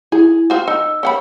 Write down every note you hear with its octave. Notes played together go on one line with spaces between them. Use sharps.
E4 G#4
C4 F4 F#4
D#4 E6
C#4 F#5 B5